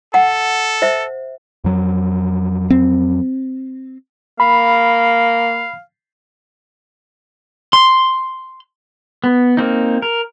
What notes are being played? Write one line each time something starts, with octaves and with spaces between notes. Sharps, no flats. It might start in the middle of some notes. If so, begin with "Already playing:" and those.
A4 F#5
C5 E5
F2 F#3
C4
A#3 F5 B5
C6
B3
A#3 C4 D#4
A#4